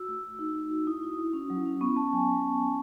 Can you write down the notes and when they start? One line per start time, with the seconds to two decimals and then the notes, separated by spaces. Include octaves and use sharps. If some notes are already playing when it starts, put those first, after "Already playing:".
Already playing: F#4 E6
0.08 A3
0.24 F#4
0.39 D#4
0.56 D#4
0.71 F#4
0.87 E4 D#6
1.03 E4
1.18 E4
1.33 C#4
1.50 F#3
1.65 C#4
1.81 B3 C#6
1.96 B3 A5
2.13 F#3 G#5
2.29 F#3
2.45 F#3
2.60 F#3